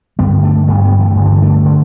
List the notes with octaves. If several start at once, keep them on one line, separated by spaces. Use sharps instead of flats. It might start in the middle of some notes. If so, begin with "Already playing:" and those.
G2 D3 G3 B3
A3 D4
G2 D3 G3 B3
G3 B3
E3 A3
G2 D3
D4
B3
A3 D4
D3